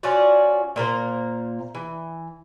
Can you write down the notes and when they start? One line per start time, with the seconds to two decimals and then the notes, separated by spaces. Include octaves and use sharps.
0.03 C#4 F4 F#4 D5
0.76 A#2 A#3 A#4 C5
1.75 E3